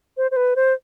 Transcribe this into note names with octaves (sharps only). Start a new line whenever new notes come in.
C5
C5
B4
C5